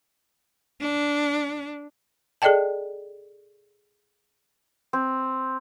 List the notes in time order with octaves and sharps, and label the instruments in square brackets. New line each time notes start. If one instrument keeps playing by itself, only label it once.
[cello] D4
[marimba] G#4 A4 D5 D#5 G5 A5
[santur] C4